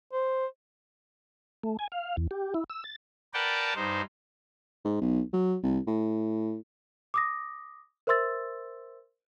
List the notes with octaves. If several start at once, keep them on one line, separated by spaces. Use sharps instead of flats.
C5
A3
G#5
F5
E2
G4
E4
E6
A6
A#4 B4 D5 F#5 G5 A5
G2 D#4 C5
G#2
B1
F#3
C2
A2
D6 D#6 A#6
A#4 C5 E5 C6 E6 A6